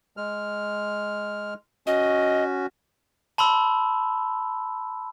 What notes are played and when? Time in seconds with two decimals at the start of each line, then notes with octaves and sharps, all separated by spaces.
0.17 G#3 F6
1.87 C#4 F#4 D#5
3.38 A5 B5 C6 E6